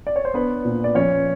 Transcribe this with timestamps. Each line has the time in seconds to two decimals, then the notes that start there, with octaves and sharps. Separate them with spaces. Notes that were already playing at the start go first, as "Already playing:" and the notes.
0.07 D5
0.16 C#5
0.25 C5
0.34 B3 D4 B4
0.65 A#2
0.84 D5
0.95 F3 C#4 C#5